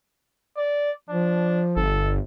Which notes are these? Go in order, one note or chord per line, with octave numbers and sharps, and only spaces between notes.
D5
F3 D4
G1 A4